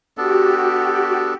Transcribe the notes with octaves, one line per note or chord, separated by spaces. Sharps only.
B3 D4 F#4 G4 A4